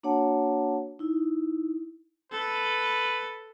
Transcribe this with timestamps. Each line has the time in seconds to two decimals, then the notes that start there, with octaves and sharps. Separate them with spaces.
0.03 A#3 D4 F#4 C#5 F#5 A5
0.99 D#4 E4
2.32 A4 B4